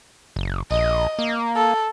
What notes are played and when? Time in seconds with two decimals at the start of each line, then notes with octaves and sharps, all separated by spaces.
0.36 F#1
0.71 A#1 D#5
1.19 A#3
1.56 A4